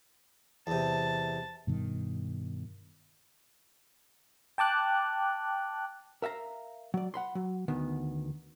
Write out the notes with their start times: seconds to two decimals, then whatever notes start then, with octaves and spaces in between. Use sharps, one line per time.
0.67 E2 C3 A5
1.67 G2 B2 D#3
4.58 G5 A5 D6 F#6
6.22 A#4 E5 F5 A#5
6.94 F#3 D5
7.14 F#5 B5 C6
7.35 F#3
7.68 D2 D#3 B3